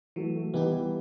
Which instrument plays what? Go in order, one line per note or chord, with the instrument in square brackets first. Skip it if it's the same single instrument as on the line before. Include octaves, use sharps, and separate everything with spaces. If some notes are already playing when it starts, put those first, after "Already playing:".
[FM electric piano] E3 [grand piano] F#3 A3
[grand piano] F#3 A3
[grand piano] E3 G3 [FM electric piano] B3 D#4 G4
[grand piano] E3 G3